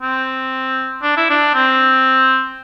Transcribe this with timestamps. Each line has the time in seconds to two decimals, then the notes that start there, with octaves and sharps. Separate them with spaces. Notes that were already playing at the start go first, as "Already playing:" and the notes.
0.02 C4
1.03 D4
1.17 E4
1.30 D4
1.54 C4